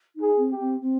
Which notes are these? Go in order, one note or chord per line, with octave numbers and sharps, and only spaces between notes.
D#4
G#4
C4
G4
C4
C4